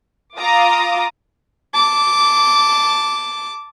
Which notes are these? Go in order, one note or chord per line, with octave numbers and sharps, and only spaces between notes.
F4 A#5 D6 D#6
A5 D6